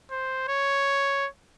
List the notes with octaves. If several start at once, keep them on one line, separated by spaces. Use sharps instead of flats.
C5
C#5